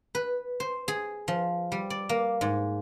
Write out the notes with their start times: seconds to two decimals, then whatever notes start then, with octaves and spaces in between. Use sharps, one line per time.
0.15 B4
0.60 C5
0.88 G#4
1.28 F3
1.72 G3
1.90 D5
2.09 A#3
2.41 G#2